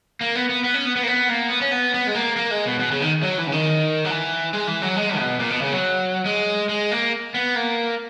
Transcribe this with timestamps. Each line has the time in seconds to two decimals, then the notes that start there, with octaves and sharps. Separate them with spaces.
0.21 A#3
0.35 B3
0.49 B3
0.64 B3
0.74 C#4
0.85 B3
0.96 B3
1.03 A#3
1.07 B3
1.29 A#3
1.50 B3
1.61 C#4
1.71 B3
1.94 B3
2.07 G#3
2.15 A#3
2.36 A#3
2.51 G#3
2.66 B2
2.79 B2
2.91 C#3
3.02 D#3
3.23 F#3
3.38 E3
3.47 C#3
3.52 D#3
4.05 F#3
4.10 E3
4.54 G#3
4.67 E3
4.82 F#3
4.96 G#3
5.18 B2
5.40 A#2
5.50 B2
5.62 C#3
5.72 F#3
6.26 G#3
6.69 G#3
6.91 A#3
7.34 B3
7.55 A#3